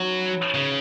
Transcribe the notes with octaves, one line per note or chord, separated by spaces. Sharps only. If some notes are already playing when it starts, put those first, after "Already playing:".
Already playing: F#3 B3 C#4 D#4 F#4
B4
C#5
B4
C#3 B4